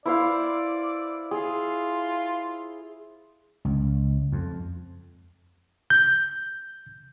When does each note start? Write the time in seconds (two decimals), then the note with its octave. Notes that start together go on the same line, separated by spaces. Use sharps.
0.06 E4 C5 D5 F5
1.31 F4 G#4
3.65 C#2
4.32 F2
5.90 G6